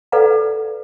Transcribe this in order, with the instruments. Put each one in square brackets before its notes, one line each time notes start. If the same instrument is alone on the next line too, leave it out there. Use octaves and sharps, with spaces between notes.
[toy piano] A4 B4 D5 F5 F#5 A#5